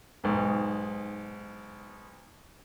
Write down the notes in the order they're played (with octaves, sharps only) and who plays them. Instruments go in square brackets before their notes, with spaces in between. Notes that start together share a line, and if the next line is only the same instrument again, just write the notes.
[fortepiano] B1 G#2